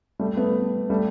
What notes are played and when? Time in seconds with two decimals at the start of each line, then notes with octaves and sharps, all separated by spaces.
0.19 G3 A3
0.37 A3 B3
0.90 G3 A3